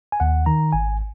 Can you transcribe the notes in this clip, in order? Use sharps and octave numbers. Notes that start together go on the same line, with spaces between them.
G#5
D#2 F#5
D#3 A#5
G#1 G#5